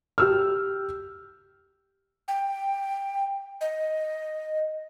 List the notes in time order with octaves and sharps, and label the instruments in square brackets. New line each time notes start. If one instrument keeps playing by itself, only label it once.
[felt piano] G4 E6 F6
[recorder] G5
D#5